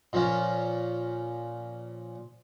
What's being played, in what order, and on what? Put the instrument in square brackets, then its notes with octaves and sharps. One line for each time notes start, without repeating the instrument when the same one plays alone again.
[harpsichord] A#2 F3 C#4